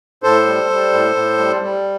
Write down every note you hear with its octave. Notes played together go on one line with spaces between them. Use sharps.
A2 A4 C5
G3
G3
A2
A2
G3
G3